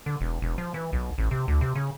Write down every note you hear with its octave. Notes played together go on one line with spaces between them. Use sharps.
D3
E1
E1
F3
E3
B1
A1
C3
D2
C3
C#3